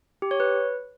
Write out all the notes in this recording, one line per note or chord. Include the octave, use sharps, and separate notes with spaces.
G4
C#5
B4